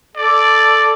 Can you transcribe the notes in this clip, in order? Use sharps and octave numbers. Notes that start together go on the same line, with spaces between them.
A4 D5